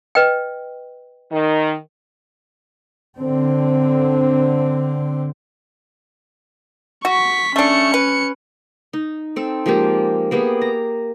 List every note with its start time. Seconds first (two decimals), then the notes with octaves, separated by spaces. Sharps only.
0.15 B4 D#5 G5
1.31 D#3
3.20 D3 C4
7.05 F#4 C#6 B6
7.56 A3 C#4 D4 C#7
7.94 B4
8.93 D#4
9.36 C4 A4
9.66 F3 G#3 A#3 G4
10.31 A#3 B3 G4 G#4
10.61 A#5